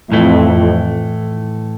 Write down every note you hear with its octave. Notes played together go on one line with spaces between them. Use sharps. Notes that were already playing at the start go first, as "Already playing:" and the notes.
F2 A2 E3 A3